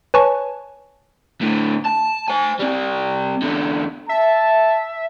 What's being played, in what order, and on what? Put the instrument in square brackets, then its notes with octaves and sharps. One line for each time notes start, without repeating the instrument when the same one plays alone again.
[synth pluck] B4 C#5 G#5 A5 C#6
[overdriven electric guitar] A2 D3
A5
C5 G#5
G3 C4
E2 D3
[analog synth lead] E5 [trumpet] A5